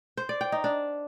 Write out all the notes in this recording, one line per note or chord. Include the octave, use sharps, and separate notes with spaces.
C5
D5
G5
D#4
D4